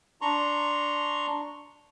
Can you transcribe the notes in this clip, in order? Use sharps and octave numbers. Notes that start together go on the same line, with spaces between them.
D4 A#5 C6 C#6